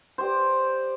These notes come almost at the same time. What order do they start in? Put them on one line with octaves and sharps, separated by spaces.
C5 G4 D5